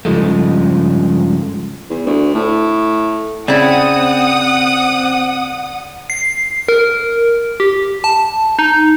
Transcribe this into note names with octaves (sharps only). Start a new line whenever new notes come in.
G2 C#3 F3 G#3 A3
E2
D2
A2
C#3 C4 E4 D5 F#5 D#6
C7
A#4
G4
A5
D#4